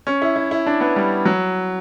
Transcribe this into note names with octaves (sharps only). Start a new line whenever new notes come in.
C#4
E4
E4
E4
D4
B3
G3
F#3